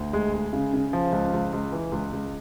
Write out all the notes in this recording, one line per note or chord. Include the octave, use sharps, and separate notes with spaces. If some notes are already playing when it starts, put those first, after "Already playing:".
Already playing: D2
G#3
G#3
C#3
C#3
F3
C#2
C#2
C#2
E3
C#2
C#2